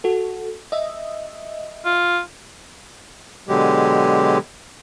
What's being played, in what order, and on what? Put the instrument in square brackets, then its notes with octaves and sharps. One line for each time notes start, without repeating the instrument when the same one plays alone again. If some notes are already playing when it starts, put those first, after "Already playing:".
[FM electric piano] F#4 A4
D#5 E5
[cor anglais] F4
[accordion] B2 D3 F#3 G#3 G4